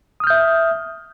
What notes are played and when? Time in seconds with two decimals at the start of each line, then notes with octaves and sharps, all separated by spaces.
0.20 D#6
0.24 F6
0.27 G6
0.30 E5